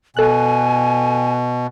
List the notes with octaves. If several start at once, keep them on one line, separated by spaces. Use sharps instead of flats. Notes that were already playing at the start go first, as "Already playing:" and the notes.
B2 A4 G#5 F#6